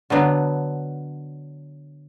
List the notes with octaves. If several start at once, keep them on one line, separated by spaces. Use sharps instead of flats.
D3 F#3 B3 D4